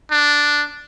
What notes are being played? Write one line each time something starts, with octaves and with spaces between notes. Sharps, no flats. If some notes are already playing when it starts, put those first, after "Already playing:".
D4